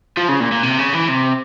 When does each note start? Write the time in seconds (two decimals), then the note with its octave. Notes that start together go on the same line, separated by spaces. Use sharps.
0.17 F3
0.29 C#3
0.40 A#2
0.52 A#2
0.63 C3
0.78 C#3
0.93 E3
1.09 C3